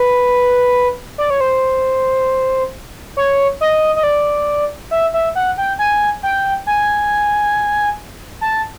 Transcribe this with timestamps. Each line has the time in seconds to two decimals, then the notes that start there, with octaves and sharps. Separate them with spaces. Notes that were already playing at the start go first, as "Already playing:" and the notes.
Already playing: B4
1.18 D5
1.30 C#5
1.41 C5
3.17 C#5
3.61 D#5
3.96 D#5
4.03 D5
4.91 E5
5.14 E5
5.35 F#5
5.58 G5
5.79 G#5
6.23 G5
6.67 G#5
8.41 A5